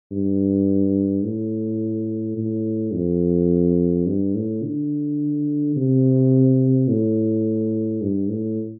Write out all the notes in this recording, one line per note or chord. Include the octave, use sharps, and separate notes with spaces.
G2
A2
A2
F2
G2
A2
D3
C3
A2
G2
A2